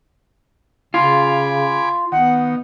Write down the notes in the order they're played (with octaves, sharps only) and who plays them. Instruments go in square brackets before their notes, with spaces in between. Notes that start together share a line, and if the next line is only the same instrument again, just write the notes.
[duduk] C#3 [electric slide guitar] F4 [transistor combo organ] G#5 B5 D6
[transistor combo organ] D#3 [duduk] B3 [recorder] F#5